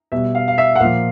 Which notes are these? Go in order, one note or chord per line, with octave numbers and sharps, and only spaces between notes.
B2 G3 E5
F5
F5
E5
F#5
A#2 F3 F5